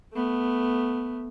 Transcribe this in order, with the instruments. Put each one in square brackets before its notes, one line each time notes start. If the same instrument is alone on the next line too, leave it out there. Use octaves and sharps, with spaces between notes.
[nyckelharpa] A3 B3